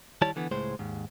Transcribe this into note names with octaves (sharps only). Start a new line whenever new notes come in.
D#3 G3 E4 C#5 A5
D3 E3 B3
C#2 A2 G#3 C5
D#2 G#2